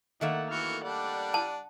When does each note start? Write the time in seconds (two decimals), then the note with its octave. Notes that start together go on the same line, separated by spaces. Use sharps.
0.21 D#3 A3 A#3 F#5
0.51 E3 F#4 F6 C#7
0.84 G3 D4 D5 F#5
1.34 A5